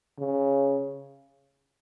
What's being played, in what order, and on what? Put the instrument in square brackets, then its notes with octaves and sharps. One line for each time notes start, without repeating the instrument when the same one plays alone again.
[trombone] C#3